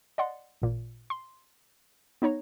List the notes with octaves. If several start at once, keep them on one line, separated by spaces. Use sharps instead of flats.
D5 D#5 F#5 C6
A1 A#2
C6
B3 D#4 C#5 A#5